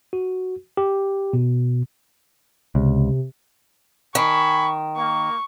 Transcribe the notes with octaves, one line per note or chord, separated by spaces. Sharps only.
F#4
G4
B2
C#2 C3
D#3 G#5 B5 C#6
A#3 C#6